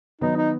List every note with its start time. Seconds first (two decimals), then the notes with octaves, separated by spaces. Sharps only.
0.21 D#3 F#3 B3 D#4
0.36 D#4